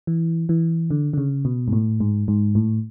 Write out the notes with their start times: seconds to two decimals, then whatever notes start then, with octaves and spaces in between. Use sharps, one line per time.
0.07 E3
0.49 E3
0.91 D3
1.13 D3
1.18 C#3
1.45 B2
1.68 G#2
1.73 A2
2.00 G#2
2.28 G#2
2.55 A2